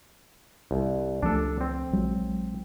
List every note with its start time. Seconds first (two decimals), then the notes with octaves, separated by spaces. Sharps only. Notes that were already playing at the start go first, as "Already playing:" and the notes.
0.71 C2
1.23 C#2 F3 A3 D4 A4
1.61 C4
1.92 A#1 F#3 G#3